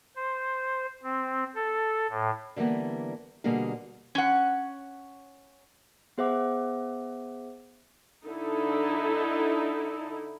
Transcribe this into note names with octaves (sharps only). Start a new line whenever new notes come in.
C5
C4
A4
A2
D3 E3 G3 A#3 B3
B2 D3 G3 A#3 F#4 G#4
C#4 F#5
B3 G#4 C5 E5 F#5 D6
D3 D#4 E4 A4